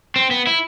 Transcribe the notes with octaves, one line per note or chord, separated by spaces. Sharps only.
C4
B3
E4